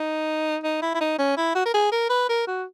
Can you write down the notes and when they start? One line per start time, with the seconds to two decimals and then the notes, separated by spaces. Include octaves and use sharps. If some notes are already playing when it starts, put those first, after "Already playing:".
Already playing: D#4
0.64 D#4
0.82 E4
0.95 E4
1.01 D#4
1.19 C#4
1.37 E4
1.55 F#4
1.66 A#4
1.74 G#4
1.92 A#4
2.10 B4
2.29 A#4
2.48 F#4